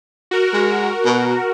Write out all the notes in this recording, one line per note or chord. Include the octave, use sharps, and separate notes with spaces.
F#4 A#4
G#3
B2